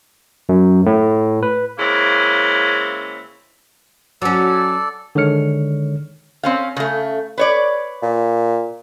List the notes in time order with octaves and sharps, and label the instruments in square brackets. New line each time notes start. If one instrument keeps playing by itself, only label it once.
[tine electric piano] F#2
A2
B4
[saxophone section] C#3 G#3 A#3 C4 C#4 E4
[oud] F#3 C#4 [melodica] A4 D5
[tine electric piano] D3 D#3 G#3 C#5 F6 C#7
[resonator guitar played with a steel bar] C4 C#4 F5
C#3 A3
B4 C#5 D5
[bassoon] A#2